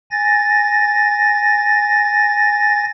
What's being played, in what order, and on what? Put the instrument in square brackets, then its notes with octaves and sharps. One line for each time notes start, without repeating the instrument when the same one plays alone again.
[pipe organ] G#5 A6 A#6